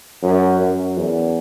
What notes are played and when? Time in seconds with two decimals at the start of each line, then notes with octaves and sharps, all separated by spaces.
0.23 F#2
0.61 F#2
0.97 E2